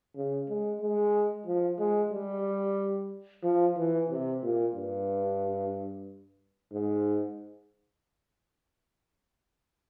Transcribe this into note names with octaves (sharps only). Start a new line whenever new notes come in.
C#3
G#3
G#3
F3
G#3
G3
F3
E3
C3
A#2
G2
G#2